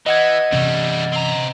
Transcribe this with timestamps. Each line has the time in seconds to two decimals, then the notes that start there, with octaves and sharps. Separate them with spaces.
0.06 E3 D#5 F#5 G#6
0.52 C3 E3 G3 A3 C#4
1.13 C4 A#5